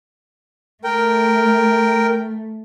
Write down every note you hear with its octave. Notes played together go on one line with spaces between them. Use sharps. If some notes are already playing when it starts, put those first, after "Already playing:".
A3 A#4 G5